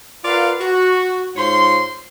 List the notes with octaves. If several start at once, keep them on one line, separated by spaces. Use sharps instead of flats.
F4 A#4 B4 D5 F5 F#5
F#4
G#2 F4 C5 C#5 C6